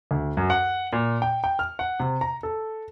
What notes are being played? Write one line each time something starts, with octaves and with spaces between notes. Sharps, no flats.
D2
F#2
F#5
A#2
G5
G5
F6
F#5
C3
A#5
A4